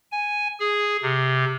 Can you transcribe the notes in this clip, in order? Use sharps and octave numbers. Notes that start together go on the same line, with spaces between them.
G#5
G#4
C3